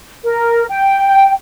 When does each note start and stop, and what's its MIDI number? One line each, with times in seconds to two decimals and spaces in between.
0.24 0.64 70
0.69 1.32 79